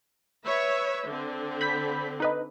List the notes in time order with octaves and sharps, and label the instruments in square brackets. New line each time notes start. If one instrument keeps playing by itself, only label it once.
[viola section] B4 C#5 E5
D3 C4
[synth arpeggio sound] B5 G6 B6
D#4 B4 D#5